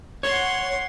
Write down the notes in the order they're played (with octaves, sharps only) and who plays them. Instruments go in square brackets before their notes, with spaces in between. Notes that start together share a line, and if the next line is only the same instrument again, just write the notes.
[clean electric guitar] C#5 [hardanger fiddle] F#5 C6